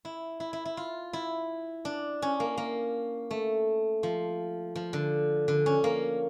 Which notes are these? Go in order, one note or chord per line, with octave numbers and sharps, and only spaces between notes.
E4
E4
E4
E4
F4
E4
D4
C#4
A#3
A#3
A3
F3
F3
D3
D3
C#4
A#3